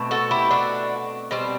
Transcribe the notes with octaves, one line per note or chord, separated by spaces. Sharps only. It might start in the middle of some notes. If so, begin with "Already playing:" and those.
Already playing: B2 A3 C4
F#4 A4
E4 G4
D4 F#4
B2 G3 C4